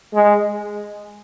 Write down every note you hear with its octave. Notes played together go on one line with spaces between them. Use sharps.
G#3